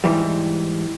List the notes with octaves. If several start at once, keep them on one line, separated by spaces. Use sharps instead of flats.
G#2 E3 G3